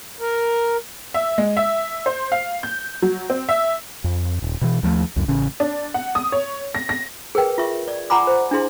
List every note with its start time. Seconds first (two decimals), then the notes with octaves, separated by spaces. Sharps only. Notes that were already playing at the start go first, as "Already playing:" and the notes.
0.20 A#4
1.14 E5
1.38 G#3
1.57 E5
2.06 C5
2.32 F5
2.63 G6
3.02 F#3
3.30 C4
3.49 E5
4.04 F2
4.42 D#1
4.61 B2 E3
4.83 D#2 F3 F#3 A3
5.16 C#2 F#2
5.28 A1 C#3 C#4
5.60 D4
5.94 F#5
6.15 D#6
6.32 C#5
6.75 A#6
6.89 A#6
7.35 G#4 A#4 B4 G5
7.58 F4 E5 C#6
7.88 D5
8.10 F4 F#5 G#5 A#5 B5 D6
8.27 C5
8.51 D4 E4 G#4 C6